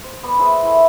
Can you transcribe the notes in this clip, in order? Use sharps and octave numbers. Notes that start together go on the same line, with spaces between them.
C5
B3 D5 B5 D6
G#4 B4 C5 E5
A3 E4